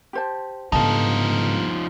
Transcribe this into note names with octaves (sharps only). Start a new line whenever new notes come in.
G4 C5 A5
G1 G#2 C#3 F3 D#4 A4 F5 A5